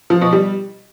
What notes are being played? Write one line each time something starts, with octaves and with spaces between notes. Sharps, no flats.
F3
B2
G3